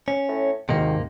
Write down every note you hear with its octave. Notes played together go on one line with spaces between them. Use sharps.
C#4
A2
G#1 D#2 G#2 C3 D#3 A#3